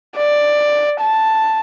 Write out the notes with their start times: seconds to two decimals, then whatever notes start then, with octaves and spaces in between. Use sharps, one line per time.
0.17 D5
1.01 A5